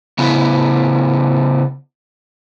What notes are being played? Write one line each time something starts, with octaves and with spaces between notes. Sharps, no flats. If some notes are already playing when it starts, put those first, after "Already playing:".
C#3 B3 E4